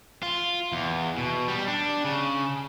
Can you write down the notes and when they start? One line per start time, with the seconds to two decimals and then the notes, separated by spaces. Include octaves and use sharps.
0.23 F4
0.72 E2
1.18 B2
1.48 G3
1.68 D4
2.04 C#3